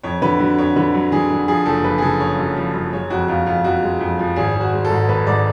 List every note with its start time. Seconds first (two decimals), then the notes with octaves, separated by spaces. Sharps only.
0.03 F2 C#5
0.22 D3 B4
0.40 D3 F#4
0.58 F2 C#5
0.76 D3 B4
0.94 F#3
1.12 D3 G#4
1.30 D3
1.48 F3 G#4
1.66 F#1 A4
1.84 F3 B4
1.98 G#4
2.02 C#3 A4
2.20 F3 C#5
2.38 F#2
2.56 F3
2.74 F#2
2.93 G#3 C#5
3.10 F2 F#4
3.28 F2 F4
3.46 F2 F4
3.64 F2 F#4
3.83 G#3
4.00 F2
4.19 F3
4.36 G#1 G#4
4.55 G#1
4.61 F#4
4.73 G#3
4.85 A4
4.90 G#2
5.09 G#1 B4
5.27 G#2 D5